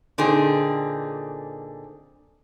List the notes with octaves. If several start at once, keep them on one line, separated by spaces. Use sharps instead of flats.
A#2 D3 C4 D#4 G#4